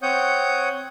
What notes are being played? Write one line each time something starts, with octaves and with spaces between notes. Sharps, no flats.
C4 C#5 F#5 D#6 G6